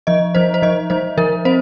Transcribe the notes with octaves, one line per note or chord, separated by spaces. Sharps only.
F3 D#5
F3 C5
C5
F3 D#5
F3 C5
F3 A#4
C4 C5